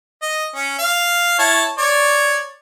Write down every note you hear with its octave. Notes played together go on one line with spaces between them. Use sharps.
D#5
C#4
F5
E4 C#5 A5
C#5 D5